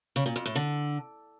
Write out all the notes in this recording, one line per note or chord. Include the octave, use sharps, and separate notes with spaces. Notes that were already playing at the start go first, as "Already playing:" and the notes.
C#3
A#2
F2
A2
D3